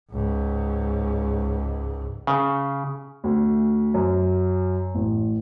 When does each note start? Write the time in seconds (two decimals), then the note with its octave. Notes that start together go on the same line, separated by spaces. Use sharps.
0.12 C#2 G#2
2.27 C#3
3.24 D2
3.94 F#2
4.95 A1